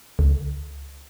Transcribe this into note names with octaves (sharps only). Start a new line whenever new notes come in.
C#2